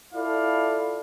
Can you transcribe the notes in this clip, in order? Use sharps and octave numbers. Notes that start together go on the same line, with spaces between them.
E4 F4 A4 D5 F5